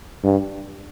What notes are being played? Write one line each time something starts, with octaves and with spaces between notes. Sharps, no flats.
G2